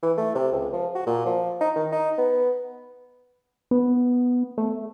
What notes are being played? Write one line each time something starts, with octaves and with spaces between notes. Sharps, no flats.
E3
A3
C3
C#2
F3
F#4
A#2
F3
D#4
D#3
D#4
B3
B3
A3